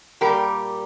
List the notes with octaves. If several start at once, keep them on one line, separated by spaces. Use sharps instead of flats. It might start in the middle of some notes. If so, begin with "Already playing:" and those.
A#2 G3 G4 A#4